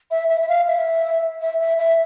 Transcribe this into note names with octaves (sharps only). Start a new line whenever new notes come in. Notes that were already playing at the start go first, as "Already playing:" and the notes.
E5
E5
E5
F5
E5
E5
E5
E5